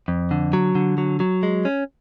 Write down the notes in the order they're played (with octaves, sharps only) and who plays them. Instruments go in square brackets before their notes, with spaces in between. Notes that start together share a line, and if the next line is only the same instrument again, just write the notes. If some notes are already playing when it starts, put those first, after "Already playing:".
[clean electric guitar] F2
D3
F#3
D3
F#3
F#3
G#3
C#4